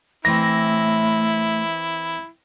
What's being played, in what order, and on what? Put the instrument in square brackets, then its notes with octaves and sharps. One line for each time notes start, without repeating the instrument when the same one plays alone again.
[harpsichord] E3 C4 [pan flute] A3 [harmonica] E4 [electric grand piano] A#6